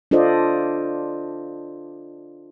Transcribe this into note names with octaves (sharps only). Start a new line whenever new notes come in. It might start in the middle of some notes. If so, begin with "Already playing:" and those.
D4 F4 A4 C5 D5 D#5